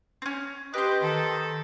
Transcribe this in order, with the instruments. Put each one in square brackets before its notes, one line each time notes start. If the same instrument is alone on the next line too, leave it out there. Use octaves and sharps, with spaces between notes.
[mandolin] C4 C#4
[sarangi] G4 [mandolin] B4 C5 [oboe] D#5
[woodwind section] D#3 [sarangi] A4